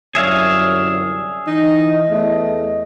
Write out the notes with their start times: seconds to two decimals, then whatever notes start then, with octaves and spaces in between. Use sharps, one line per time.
0.15 G1 C2 F#2 G#4 C#5 D5 E5 F5
1.47 E3 D#4 D#5
2.09 E2 A3